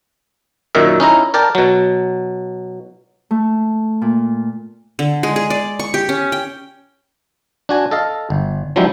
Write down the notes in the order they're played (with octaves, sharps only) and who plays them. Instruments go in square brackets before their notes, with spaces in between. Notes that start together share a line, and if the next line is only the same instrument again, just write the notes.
[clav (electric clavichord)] F#2 A#2 D#3 E5
C#4 D#4 E4 A#5
A#4 D5 G5 A5
B2 F#3
[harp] A3
A#2
[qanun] D3
G#3
G#4
D5
C#6
G4
C#4
G5
[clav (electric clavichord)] D4 F#4 G#5
A4 D#5 F5
G1
F3 F#3 G#3 D4 E4 G4